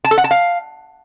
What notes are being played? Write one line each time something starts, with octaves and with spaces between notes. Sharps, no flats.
A5
A4
F#5
A5
F5